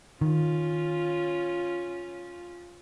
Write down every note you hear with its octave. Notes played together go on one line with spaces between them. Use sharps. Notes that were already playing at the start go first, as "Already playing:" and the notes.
D#3 C#4 F4